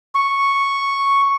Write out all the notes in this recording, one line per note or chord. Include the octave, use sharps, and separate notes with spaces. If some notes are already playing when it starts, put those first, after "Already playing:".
C#6